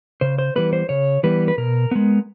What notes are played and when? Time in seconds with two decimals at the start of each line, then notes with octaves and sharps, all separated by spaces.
0.21 C#3 C5
0.38 C5
0.56 E3 G3 B3 B4
0.73 C5
0.89 C#3 C#5
1.23 E3 G3 B3 B4
1.48 B4
1.58 B2 A#4
1.91 G#3 B3